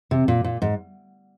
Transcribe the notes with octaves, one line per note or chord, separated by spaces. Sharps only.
C3
A#2
A#2
G#2